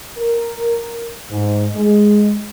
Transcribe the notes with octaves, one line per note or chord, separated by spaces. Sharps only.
A#4
G#2
G#3